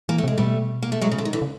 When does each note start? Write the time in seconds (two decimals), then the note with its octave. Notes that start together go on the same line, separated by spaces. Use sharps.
0.09 E3 A#3
0.18 A3
0.24 C3 G#3
0.38 B2 G3 A3
0.83 A#3
0.92 A3
1.01 F#3 G#3
1.11 C#3
1.18 D3
1.25 D#3
1.33 D3 E3
1.42 C#3